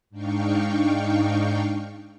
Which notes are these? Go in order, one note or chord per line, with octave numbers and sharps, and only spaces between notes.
G#2 D4 D#4 F5 G5 C#6